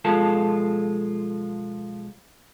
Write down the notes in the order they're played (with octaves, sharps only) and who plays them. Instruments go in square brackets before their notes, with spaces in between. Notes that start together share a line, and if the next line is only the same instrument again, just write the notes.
[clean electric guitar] B1 F3 G#3 F4 A4 A5